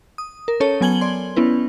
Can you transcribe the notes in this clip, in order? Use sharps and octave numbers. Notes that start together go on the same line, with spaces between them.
D#6
A#4
C#4 A4 C#5 A5
F#3 B3 G#5 G#6 F#7 G7
D5 C6
B3 C#4 E4 B4